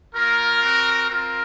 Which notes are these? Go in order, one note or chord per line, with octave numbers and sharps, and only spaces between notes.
A#3 F4 A#4
C4 F#4
C4 F4 A#4